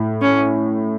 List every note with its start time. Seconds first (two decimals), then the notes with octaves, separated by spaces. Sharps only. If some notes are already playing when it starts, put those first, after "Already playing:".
Already playing: A2
0.22 C#4